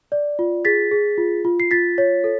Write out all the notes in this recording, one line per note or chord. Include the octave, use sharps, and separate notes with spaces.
D5
F4
G#4 A6 B6
G#4
F4
F4
C7
F4 A6 B6
C#5
A4